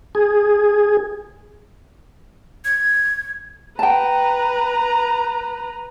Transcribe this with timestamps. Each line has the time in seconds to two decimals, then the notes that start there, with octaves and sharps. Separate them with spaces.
0.15 G#4
2.65 G#6
3.79 B4 G5 A5 A#5